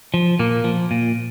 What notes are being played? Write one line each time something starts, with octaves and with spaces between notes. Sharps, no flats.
F3
A#2 A#3
F3
A#2